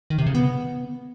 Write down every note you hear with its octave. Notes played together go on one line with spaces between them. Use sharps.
D#3
C3
C#3
B3